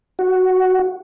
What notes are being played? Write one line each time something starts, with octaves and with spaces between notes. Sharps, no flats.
F#4